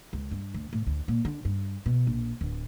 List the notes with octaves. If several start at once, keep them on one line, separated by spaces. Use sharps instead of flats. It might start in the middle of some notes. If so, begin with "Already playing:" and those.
C#2
G2
D2
A2
D2
A#2
D3
G2
B2
A#1
D1